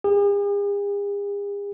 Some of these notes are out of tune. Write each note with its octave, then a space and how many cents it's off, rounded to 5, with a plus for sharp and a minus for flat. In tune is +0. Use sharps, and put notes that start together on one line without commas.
G#4 -45